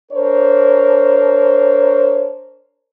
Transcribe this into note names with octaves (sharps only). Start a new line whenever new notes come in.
D4 A#4 C5 C#5